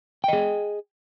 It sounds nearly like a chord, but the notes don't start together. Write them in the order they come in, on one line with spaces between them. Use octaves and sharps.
G5 D#5 G#4